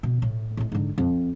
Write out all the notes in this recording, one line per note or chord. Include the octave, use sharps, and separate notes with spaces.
B2
A2
A2 G#3
G#2 D3
F2